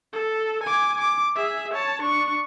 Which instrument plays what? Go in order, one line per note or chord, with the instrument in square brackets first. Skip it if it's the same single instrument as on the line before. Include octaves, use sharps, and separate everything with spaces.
[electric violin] A4
G#5 D6
D6
G#4 E5
C#5 A5
D4 C#6